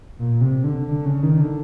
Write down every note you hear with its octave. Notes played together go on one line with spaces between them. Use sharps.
A#2
C3
D3
D3
C#3
D#3
D3